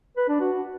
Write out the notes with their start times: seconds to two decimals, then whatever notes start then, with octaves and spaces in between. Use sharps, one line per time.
0.17 B4
0.29 D4
0.40 F#4